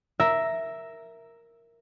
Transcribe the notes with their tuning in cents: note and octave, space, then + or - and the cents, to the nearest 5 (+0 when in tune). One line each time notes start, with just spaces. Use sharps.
A#4 +0 E5 +0